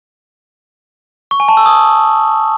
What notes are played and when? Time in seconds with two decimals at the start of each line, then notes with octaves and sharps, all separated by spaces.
1.31 C#6
1.40 G#5
1.48 A5
1.57 E6
1.66 D#6